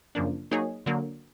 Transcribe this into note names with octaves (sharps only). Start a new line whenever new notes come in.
F#2 C#3 F3 A#3 D4
F#3 A#3 D#4 G#4 C#5
D3 F#3 A#3